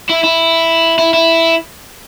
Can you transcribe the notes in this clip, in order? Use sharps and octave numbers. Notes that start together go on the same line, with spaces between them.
E4
E4
E4
E4